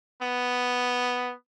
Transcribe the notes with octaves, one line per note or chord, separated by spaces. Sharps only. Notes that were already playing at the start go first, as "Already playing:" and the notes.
B3